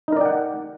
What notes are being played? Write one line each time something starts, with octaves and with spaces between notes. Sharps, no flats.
D#4 A#4 D5 F#5 G5